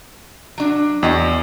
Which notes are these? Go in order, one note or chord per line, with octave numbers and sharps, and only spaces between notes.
F#3 D4
E2 F#4 D#5 G5